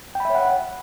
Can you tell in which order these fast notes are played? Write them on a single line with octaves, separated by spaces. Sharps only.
G5 B5 E5 C#5 F#5